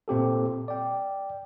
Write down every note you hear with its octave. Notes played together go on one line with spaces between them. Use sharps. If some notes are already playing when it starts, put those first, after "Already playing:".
A#2 C4 G4 A4
D5 G5